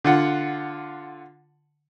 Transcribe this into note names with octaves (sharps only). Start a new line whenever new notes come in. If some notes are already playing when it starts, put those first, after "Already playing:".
D3 F4 F#5